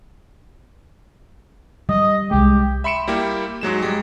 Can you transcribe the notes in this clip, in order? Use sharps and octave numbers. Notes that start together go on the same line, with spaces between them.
G3 D#5
C2 G#3 G4
E5 B5 C6 C#7 D7 E7
G3 A#3 E4 G4
G#2 F#3 G#3 E7
G3 G#3